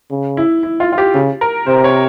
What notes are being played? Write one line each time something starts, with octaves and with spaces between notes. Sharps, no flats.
C#3
E4
E4
F4
F4
G4
C#3
A#4
C3 C5
C#5